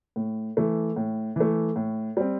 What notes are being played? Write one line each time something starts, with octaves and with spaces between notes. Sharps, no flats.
A2
E3 A3
A2
E3 A3
A2
G3 C4